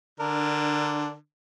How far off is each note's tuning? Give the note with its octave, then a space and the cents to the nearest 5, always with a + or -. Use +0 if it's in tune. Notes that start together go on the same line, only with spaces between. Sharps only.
D3 +20 D4 +0 A#4 +0